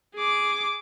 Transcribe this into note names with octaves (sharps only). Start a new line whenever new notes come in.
G#4 D6